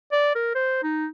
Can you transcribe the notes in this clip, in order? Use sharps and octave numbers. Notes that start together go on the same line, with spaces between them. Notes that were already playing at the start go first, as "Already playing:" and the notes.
D5
A#4
C5
D#4